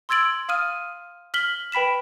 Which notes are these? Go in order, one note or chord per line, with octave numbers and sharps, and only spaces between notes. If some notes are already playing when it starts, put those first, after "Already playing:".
C6 E6 G#6 A6 D7 F#7
F5 D#6 F6 D#7
F6 B6 F#7 G7
B4 G5 B5 B6 E7